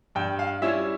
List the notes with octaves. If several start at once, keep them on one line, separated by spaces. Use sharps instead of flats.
G2 G5
F5
G3 C#4 E4 E5